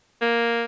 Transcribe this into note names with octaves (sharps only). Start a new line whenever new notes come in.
A#3